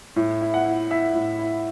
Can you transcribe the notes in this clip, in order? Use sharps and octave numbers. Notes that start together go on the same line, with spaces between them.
A2
E4
F#5
E4
E4 E5
A2
E4